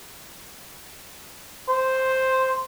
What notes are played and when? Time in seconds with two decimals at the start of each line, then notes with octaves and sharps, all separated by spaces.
1.69 C5